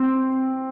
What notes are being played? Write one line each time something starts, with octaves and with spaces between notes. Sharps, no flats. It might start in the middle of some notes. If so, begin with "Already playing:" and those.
Already playing: C4